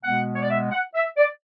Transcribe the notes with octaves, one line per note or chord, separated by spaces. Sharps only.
B2 G#3 B3 F#5
C#5
D5
E5
F#5
E5
D5